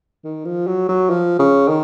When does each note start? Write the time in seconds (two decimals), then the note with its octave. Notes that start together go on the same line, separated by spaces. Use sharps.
0.24 D#3
0.45 F3
0.67 F#3
0.88 F#3
1.10 F3
1.39 C#3
1.68 D#3